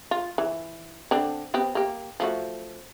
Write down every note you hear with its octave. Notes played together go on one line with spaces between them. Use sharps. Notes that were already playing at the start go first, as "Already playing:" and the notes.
F4
E3
D3 C4 D4
B3 C4 G4
A#3 G4
F3 A3 F#4